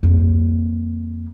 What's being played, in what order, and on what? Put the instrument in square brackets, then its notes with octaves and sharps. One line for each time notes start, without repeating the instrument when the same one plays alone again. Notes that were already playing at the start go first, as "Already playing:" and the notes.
[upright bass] F2 A#3